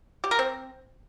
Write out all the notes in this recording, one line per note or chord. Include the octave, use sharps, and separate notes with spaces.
G4
A#4
C4